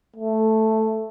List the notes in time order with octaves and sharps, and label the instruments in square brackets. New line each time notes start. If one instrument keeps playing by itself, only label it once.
[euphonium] A3